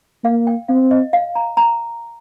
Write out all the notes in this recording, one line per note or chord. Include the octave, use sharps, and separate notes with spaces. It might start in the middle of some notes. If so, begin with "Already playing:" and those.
A#3 F5
G5
C4 F5
D#5
F5
A#5
A#5